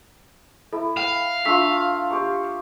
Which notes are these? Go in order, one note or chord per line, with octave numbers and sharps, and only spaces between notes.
E4 A4
F5 G5
A3 D4 F4 E6 B6
G4 C#6